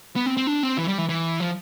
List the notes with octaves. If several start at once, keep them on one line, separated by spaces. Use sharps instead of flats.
B3
C4
C4
D4
C4
E3
G3
E3
E3
F3